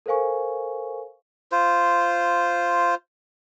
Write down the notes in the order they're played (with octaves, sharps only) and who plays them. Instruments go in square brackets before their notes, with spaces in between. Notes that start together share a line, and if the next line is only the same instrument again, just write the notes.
[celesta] A4 A#4 C5 F5 G#5 C#6
[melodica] F4 C5